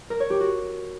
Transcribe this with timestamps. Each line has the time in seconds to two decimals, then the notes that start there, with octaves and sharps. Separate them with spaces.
0.10 A#4
0.20 C#5
0.30 G4
0.40 F#4